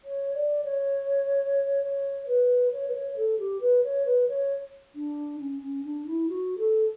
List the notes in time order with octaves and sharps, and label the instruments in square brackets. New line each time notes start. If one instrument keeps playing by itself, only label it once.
[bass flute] C#5
D5
C#5
C#5
B4
C#5
B4
C#5
A4
G4
B4
C#5
B4
C#5
D4
C#4
C#4
D4
E4
F#4
A4